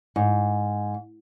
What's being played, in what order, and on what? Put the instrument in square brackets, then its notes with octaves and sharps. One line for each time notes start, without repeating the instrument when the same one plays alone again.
[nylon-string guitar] G#2